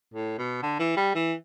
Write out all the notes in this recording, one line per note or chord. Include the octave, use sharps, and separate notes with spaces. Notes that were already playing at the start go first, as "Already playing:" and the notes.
A2
B2
D3
E3
G3
E3